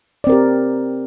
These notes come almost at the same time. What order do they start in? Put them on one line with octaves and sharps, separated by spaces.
D5 C4 A#4 G4